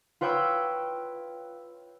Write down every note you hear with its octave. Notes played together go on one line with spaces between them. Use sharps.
F4 B4 C#5 G5 B5 E6